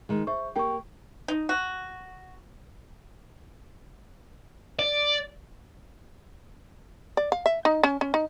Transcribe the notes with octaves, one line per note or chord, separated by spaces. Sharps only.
D#3 G#3
C5 E5 C#6
A#3 G4 A#4 G5 C#6
D#4
F#4
D5
D5
F5
E5
D#4
C#4
C#4
D#4